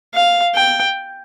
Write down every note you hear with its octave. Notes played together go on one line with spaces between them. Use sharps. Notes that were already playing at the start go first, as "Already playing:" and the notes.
F5
G5